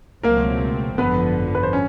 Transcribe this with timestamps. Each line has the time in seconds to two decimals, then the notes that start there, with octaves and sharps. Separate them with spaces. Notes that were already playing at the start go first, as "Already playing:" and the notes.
0.23 C#2 B2 F#3 A3 A#3 C4 A#4
0.98 G#1 F#2 D3 F3 B3 B4
1.55 B4
1.63 C5
1.73 C#4